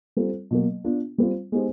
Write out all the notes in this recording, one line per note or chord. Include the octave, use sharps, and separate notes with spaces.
G3 C4 F4 A4
B2 F#3 A#3
B3 D4 F4
G3 C4 F4
G#3 B3 D#4 G4 C5